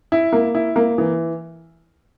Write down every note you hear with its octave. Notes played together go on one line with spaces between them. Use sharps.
E4
A#3
E4
A#3
E3